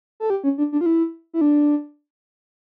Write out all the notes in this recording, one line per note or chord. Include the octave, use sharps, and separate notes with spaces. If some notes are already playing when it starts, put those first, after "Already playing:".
A4
G4
C#4
D4
D4
F4
E4
E4
D4